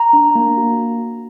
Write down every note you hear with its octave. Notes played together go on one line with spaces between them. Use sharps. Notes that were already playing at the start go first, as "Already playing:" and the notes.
Already playing: A#5
D4
A#3
F#4